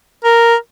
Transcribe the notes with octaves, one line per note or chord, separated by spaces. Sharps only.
A#4